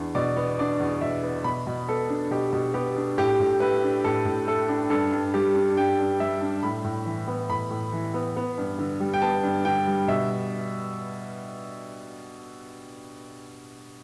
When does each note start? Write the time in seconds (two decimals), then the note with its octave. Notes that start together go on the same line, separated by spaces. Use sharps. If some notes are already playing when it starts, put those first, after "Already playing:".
Already playing: E2 D4
0.15 B2 D5
0.36 B3
0.59 D4 D5
0.80 E2
1.01 B2 E5
1.23 B3
1.44 B2 B5
1.67 B2
1.89 B3 A4
2.09 D4
2.31 B2 G4
2.52 B2
2.74 B3 G4
2.97 D4
3.18 A2 G4
3.40 A2
3.60 A3 B4
3.83 D4
4.04 A2 A4
4.25 A2
4.47 A3 A4
4.68 D4
4.90 G2 A4
5.12 G2
5.34 G3 G4
5.55 D4
5.77 G2 G5
5.99 G2
6.20 G3 E5
6.41 D4
6.63 A2 B5
6.84 A2
7.06 E3
7.27 B3
7.50 A2 B5
7.71 A2
7.92 E3
8.14 B3
8.37 B3
8.58 G2
8.79 D3
9.00 G3
9.14 G5
9.22 B3 A5
9.43 G2
9.65 D3 G5
9.87 G3
10.08 B2 E5